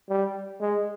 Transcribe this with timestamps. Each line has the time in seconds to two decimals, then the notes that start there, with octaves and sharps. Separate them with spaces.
0.09 G3
0.60 G#3